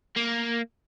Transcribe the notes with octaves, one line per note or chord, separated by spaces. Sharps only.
A#3